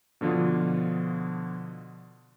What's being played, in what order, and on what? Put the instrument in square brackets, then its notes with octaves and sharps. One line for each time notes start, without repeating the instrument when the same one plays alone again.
[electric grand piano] B2 D3 F3 D4 F4